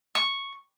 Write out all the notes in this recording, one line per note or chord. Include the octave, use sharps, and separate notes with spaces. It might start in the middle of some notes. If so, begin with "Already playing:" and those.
C#6